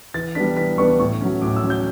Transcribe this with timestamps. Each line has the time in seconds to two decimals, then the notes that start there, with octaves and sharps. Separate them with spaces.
0.14 E3 A6
0.35 G3 B3 D4 B6
0.57 E3 B6
0.78 G3 B3 D4 C#6
0.99 A2 C#6
1.21 F#3 C#4
1.42 A2 D6
1.56 E6
1.63 F#3 C#4
1.70 G6